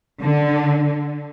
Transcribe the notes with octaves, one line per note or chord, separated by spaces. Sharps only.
D3